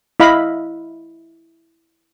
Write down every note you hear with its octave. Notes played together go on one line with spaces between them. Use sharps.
E4 D#5 F5 B5